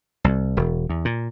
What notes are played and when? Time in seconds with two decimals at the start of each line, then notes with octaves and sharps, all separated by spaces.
0.24 C2
0.57 E1
0.90 E2
1.05 A#2